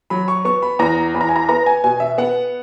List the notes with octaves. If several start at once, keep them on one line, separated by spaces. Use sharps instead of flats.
F#3 B5
C#6
B3 C#6
B5
E2 A#5
E2 B5
A#5
G#5
A#5
B3 A#5
G#5
B2 G#5
E5
B3 F#5